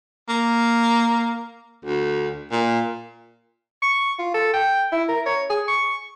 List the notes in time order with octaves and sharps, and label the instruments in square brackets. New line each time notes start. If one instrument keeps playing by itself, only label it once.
[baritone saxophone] A#3
D2
A#2
[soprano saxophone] C#6
F4
A4
G5
E4
A#4
C#5
G#4
C#6